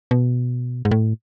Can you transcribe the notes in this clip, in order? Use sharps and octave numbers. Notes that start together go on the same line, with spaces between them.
B2
G#2
A2